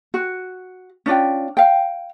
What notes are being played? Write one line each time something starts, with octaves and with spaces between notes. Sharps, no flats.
F#4
C#4 D4 F4 G5
F5 G5